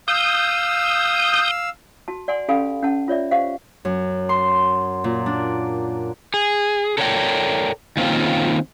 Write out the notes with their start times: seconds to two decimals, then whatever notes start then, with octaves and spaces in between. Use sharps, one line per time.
0.08 F5 D#6 E6 G6
2.08 F#4 A5
2.28 D5 F#5 G#5 C6
2.48 C#4 G4 A4 F5 G#5 B5
2.82 C#4 F#5 A5
3.08 F4 C#5 D5 E5
3.31 G4 C5 F5 F#5
3.85 F#2
4.29 C6
5.04 A#2
5.26 D4
6.34 G#4
6.98 A4 A#4 C#5 D5 F5 G5
7.97 D#3 A#3 C4 C#4 F4